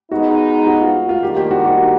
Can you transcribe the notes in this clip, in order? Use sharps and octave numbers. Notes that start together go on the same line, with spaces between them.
G#3 B3 D#4 F#4
F#4
F4
F4
G#2 D#3 G3 A#3 D4 G4
G4
F#4
F#4